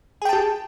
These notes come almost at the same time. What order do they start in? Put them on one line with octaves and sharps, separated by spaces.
G#4 G5 A5 G4